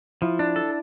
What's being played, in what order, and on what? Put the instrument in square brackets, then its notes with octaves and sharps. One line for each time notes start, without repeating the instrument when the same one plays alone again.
[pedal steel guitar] F3 [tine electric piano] E4
[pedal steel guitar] D4
A4